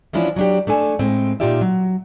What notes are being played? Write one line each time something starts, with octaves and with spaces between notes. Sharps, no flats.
E3 F3 C#4 D4 E4 F4
F#3 D4 G4
A3 D4 A4 G#5
A2 G#3 C4
A#2 D#4 F4 G4 D5 E5
F#3